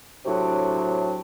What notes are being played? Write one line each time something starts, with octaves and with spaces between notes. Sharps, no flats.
A2 C3 F#3 D4 F#4